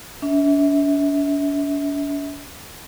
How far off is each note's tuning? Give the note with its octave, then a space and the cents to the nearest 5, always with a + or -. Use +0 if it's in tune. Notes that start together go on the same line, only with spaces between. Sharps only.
D4 -45 E5 -30